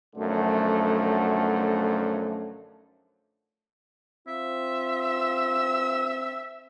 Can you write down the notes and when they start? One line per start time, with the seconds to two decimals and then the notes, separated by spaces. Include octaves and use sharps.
0.16 B1 F#2 D3 F3 A3
4.28 C4 F4 E5
5.03 E6